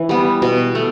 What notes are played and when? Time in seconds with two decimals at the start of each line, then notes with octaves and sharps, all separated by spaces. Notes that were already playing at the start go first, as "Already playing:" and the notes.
Already playing: E3
0.09 G3 B3
0.42 B2
0.75 A3